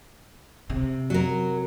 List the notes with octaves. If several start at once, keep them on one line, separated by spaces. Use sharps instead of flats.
C3
F#3 A#4